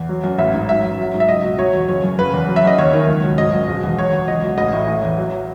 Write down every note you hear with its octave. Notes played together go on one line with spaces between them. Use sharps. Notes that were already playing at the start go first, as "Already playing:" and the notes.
Already playing: E2
F#3
F#2
A1 E5
G#2
F#3 E5
F#2
F#3
G#2
E5
C#2 D#5
B2
F#3 C#5
E2
F#1 C#5
F#2
F#1 B4
E2
F#3
E5
F#2 D#5
D#2 C#5
D#3
C#2
B2
G#1 D#5
F#2
E1
E2
F#3 C#5
E2
C#2 D#5
B2
A1 D#5
A2
E3
E2
F#3